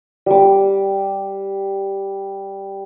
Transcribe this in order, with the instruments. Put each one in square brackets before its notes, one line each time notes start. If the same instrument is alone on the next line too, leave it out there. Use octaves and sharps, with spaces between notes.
[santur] G3 D6